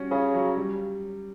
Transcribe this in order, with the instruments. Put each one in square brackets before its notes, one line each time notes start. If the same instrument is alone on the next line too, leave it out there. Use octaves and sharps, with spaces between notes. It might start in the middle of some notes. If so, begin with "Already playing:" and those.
Already playing: [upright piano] G3 C#4 F#4
[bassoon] C#3 [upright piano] C#4
[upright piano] F#3
G3